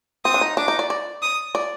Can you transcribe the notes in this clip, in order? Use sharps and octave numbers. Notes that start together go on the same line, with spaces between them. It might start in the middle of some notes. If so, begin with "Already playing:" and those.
C4 D#6
D4
D#4
D4 D6
D#4
D5
D5
D#6
D5